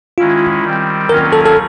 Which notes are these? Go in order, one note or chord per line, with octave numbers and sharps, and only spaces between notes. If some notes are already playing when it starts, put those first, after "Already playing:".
D#3 G#3 C#4 E4 F4
D#3 G3 C4
D#3 F#3 A#3 C#4 F4 A#4
A4
A4